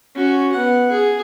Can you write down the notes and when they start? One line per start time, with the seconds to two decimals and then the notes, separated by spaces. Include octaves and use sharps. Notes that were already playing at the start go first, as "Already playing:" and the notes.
0.15 C#4 F#4
0.52 B3 F#5
0.91 G#4